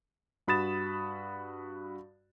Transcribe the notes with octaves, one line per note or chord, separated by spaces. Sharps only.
G2 F#4 B5 D#6 A6 E7